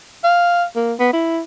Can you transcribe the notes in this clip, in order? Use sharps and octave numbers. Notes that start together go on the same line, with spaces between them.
F5
A#3
B3
E4